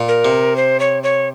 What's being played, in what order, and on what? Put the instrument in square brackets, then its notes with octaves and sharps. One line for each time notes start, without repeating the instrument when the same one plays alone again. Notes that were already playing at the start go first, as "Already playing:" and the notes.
Already playing: [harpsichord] A#2
[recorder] A#4
[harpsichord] C3
[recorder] C5
C#5
C#5